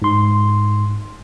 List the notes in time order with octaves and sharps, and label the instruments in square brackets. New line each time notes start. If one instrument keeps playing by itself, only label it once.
[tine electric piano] G#2 C6